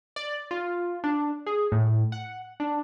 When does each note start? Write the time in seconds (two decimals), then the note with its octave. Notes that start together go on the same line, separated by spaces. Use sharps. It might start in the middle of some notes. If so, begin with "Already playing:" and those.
0.16 D5
0.51 F4
1.04 D4
1.46 G#4
1.72 A2
2.12 F#5
2.60 D4